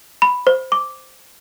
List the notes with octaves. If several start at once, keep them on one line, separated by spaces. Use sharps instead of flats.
B5
C5
D6